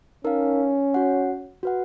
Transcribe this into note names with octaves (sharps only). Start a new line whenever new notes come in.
C#4 D#4 A#4 F5
F#4 C#5 F#5
F#4 B4 F#5